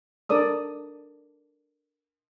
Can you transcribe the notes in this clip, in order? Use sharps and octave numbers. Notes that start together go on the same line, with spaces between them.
D4 A4 A#4 D5 D#6 E6